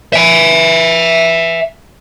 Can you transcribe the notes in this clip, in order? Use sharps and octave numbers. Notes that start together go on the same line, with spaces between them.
E5 G#5